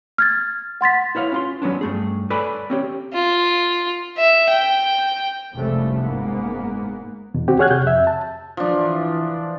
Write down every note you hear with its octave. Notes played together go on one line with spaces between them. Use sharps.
F6 G#6 A6
F#5 C6 A6 B6
E4 B4 C#5 F5
C#4 F4 C6
F#3 B3 C#4 D4
G2 A3 G#4
A4 B4 C#5 D5 G#5 B5
C4 C#4 G4
F4
E5
G5
F1 C2 C#3 F3 G3 A3
F#1 G#2 A#3 B3
E2 B2
D2 C4 F#4 G4
G#4 C#5 F#5 F6 F#6 G#6
C3 G6
F2 E5
A5
E3 F3 D4